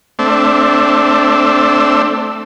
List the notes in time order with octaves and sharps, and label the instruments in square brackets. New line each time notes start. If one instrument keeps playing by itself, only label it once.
[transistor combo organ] A3 C4 D4 E5